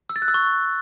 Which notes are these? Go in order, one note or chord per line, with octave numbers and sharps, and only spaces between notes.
E6
A6
F#6
E6
C#6